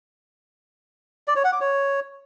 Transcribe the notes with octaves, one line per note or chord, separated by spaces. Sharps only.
D5
C#5
F#5
D6
C#5